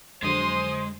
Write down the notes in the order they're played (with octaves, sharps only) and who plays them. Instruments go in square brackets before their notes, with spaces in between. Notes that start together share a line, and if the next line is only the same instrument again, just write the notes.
[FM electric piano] F2 D3 F#3 [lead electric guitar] G#3 [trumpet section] C5 [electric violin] C6 D#6